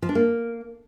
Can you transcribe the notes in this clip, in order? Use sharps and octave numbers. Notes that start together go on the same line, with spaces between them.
F3
D4
A#3